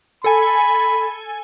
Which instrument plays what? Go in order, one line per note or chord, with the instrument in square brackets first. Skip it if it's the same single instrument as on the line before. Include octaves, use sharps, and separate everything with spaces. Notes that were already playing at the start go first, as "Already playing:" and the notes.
[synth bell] A4 G#5 [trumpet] B5